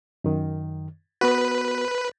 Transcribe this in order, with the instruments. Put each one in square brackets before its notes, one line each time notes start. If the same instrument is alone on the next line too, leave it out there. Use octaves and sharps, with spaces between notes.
[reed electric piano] F#2 D#3
[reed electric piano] B3 F#4 [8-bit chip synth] B4